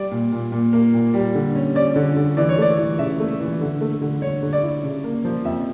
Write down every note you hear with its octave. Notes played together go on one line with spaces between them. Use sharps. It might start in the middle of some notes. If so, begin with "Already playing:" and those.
Already playing: G3 D5
A#2
A#2
A#2
A#3
A#2
G3
D3
C#4
C#4 D5
D3
D3
E3 D5
C#5
A3 D5
E3
C#3 E5
A3
E3
D3
A3
D3
D3 C#5
D3
D5
E4
C#3
A#3
F3
F2 E5